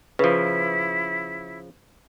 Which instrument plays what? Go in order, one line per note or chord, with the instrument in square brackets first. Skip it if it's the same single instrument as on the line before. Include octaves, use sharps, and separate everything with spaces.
[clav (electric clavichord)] C#3 F3 [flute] E4 [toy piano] B4